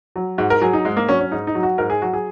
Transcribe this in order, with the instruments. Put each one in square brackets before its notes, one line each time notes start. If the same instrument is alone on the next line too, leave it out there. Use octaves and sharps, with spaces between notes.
[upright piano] F#3
G#2 F#4
A#4
F#3 G#4
D#4
G#2 G#3
A#3
F#3 C#4
C#4
G#2 D#4
D#4
F#3
F#4
G#2 A#4
G#4
F#3 F#4
G#4